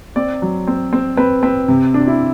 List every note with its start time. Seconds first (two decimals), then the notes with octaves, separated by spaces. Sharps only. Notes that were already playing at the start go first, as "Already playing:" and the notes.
0.16 C4 D5
0.42 F#3
0.67 C4
0.93 C4
1.17 C4 B4
1.43 C4 B4
1.68 C3
1.94 D4
2.07 E4